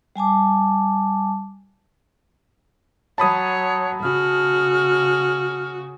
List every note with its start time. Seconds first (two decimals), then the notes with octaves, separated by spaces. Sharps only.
0.16 G3 G#5 A5 D6
3.18 F#3 C#5 A5 B5 D#6
4.03 C#3 F#4 F6